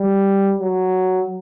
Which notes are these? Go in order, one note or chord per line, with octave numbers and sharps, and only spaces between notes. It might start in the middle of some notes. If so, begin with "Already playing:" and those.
Already playing: G3
F#3